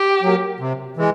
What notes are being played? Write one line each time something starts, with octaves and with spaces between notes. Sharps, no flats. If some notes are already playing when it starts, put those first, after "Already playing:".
Already playing: G4
F#3 A#3
C3
E3 G#3